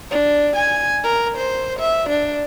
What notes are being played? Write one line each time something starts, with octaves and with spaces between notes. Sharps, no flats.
D4
G#5
A#4
C5
E5
D4